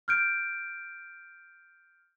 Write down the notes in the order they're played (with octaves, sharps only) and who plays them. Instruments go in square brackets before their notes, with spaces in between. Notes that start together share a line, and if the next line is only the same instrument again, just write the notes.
[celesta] F6 G6 D7